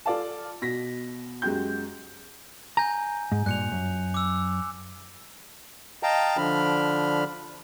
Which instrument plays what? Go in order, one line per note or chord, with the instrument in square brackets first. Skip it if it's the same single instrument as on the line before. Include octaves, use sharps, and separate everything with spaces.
[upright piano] F4 A4 D5 F5 A5
B2 A#6 B6
F#2 G#3 F#4 G4 G6
[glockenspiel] G#5 G6 [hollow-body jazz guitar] A#5
[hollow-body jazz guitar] G#2
[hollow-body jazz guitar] G2 A#2 [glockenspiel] F#6 C#7 F7
[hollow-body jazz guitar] F#2
[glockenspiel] D6 E6
[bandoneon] D#5 F5 G5 A5 A#5
D3 F3 D4 B5 F6